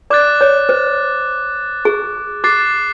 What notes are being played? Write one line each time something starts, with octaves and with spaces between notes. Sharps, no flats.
D5 D6 F#6 A6
C#5
C5
G#4
G4 D6 F#6 A6 C7